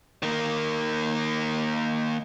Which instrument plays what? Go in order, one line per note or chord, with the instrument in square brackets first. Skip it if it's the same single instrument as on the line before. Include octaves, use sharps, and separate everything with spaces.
[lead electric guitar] D#3 A#3